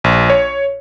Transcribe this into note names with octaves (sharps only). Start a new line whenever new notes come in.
A#1
C#5